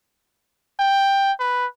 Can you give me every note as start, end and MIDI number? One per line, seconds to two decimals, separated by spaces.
0.80 1.32 79
1.40 1.66 71